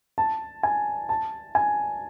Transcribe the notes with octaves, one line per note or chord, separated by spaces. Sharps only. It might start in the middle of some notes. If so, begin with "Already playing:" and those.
A5
G#5
A5
G#5